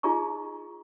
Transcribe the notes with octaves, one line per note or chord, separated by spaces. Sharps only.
D#4 F4 G#4 D#5 A#5 C#6